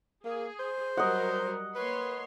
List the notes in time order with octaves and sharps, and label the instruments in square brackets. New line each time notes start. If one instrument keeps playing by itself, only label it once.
[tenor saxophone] A#3 [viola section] G#4
[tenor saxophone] C5
[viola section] F#3 G3 A#4 [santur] D#5 F#5
[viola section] A#3 C#5 C6 [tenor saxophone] B4